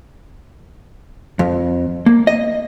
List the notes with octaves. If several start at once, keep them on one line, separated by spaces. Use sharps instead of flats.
F2
A#3
D#5